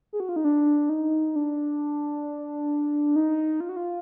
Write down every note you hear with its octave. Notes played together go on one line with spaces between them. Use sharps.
G#4
F#4
F4
D#4
D4
D#4
D4
D#4
F4
F#4
F4